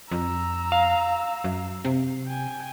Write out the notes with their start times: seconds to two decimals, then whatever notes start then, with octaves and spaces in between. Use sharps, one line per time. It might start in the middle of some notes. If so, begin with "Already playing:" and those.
0.11 F2 A#5 E6
0.72 F5
1.44 F#2
1.85 C3
2.27 G5 G#5